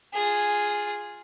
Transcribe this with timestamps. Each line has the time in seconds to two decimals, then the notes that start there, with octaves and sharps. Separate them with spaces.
0.14 F4 G#4